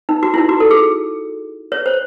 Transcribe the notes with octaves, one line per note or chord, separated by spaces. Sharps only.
D#4
F#4
E4
D#4
F#4
A4
G#4
C#5
C5